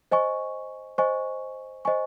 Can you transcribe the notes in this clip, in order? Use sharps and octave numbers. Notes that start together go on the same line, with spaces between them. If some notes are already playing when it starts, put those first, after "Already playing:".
C5 D#5 G#5 C#6
C5 D#5 G#5 C#6
C5 D#5 G#5 C#6